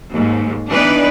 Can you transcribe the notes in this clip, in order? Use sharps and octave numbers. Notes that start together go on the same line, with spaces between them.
D#2 G#2
E3 B3 D4 D#4 B4 D5